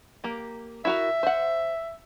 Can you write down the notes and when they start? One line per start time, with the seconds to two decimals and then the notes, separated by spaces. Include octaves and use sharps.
0.24 A#3 G4
0.85 E4 F#4 A#4 E5
1.23 C5 F#5